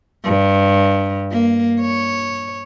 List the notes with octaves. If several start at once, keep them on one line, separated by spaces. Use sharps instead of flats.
G2
A#3
C#5